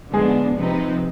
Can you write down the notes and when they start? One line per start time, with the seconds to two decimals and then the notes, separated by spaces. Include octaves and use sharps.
0.13 D3 F3 G#3 B3 D4 G#4
0.56 C3 F3 C4 D#4 B4